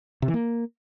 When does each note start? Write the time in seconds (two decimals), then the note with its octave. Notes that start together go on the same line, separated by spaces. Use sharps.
0.22 C3
0.28 E3
0.34 A#3